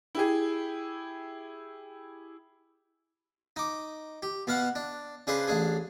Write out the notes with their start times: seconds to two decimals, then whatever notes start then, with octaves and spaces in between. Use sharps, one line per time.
0.15 E4 G4 G#4
3.56 D#4 D6
4.22 G4
4.47 B2 B3 F5 F#5
4.75 D4
5.27 C#3 D4 G#4 B4 C5
5.48 A1 D4 G#4